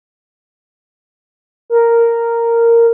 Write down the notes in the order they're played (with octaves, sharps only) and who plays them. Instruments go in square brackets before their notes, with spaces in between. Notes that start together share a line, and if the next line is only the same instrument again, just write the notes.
[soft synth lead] A#4